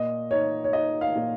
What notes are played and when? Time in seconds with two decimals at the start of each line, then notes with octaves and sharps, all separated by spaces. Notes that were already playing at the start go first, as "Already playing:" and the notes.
Already playing: A#2 D#5
0.31 D#4 C#5
0.64 C#5
0.73 D#4 D#5
1.01 F5
1.16 A#2